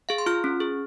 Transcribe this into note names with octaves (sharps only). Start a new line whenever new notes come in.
G#4 F5
C6
F4 F6
C#4
G#4